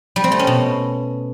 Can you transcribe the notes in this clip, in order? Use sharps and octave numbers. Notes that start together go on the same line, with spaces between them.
G3
C4
A3
C#4
B2